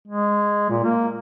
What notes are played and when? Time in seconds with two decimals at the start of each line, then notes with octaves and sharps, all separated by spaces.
0.07 G#3
0.70 A#2
0.83 A#3